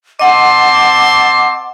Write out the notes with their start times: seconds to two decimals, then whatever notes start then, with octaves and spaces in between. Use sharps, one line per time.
0.19 C4 D#5 F#5 A5 C6 D6